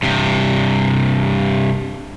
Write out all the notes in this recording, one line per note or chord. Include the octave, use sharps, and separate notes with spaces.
G2 C3